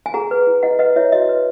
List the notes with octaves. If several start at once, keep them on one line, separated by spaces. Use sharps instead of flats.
G#5
G#4 F#5 A#5
B4
E4
E4 D#5 F#5
B4 D#5 F#5
E4 C#5 E5
F#4 D#5
B4